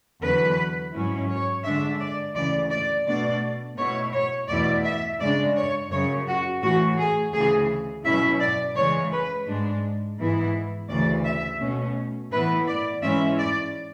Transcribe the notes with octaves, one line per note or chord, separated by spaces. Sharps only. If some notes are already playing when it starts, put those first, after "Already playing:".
E2 D3 F#3 B4
G#2 F#3 C#4 E4
C#5
D3 G#3 D4 E5
D5
D2 C#3 E3 D5
D5
B2 A3 D4 D5
B2 A3 E4 C#5
C#5
E2 B2 A3 E4 D5
E5
C#3 G#3 D4 D5
C#5
F#2 C#3 F#3 C#5
F#4
A2 E3 A3 F#4
G#4
D2 C#3 E3 G#4
B2 F#3 C#4 E4 E5
D5
C#3 E3 G#3 C#5
B4
G#2 G#3 D4
G#2 E3 G#3 B3 E4
D2 C#3 E3 D5
E5
B2 A3 C#4
A2 E3 B3 E4 B4
D5
G#2 E3 G#3 C#4 E4 E5
D5